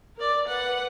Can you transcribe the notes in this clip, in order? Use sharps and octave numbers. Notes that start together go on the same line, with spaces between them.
A#4 D5
B4 F#5